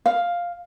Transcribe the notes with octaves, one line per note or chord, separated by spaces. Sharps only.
F5